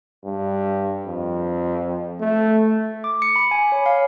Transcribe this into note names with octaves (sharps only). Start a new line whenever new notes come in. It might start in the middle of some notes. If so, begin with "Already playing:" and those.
G2
F2
A3
D6
C#7
B5
G#5
C#5
F5